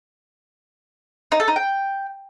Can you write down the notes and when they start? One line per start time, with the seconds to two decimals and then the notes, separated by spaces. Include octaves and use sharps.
1.32 D#4
1.40 A4
1.48 D#4
1.56 G5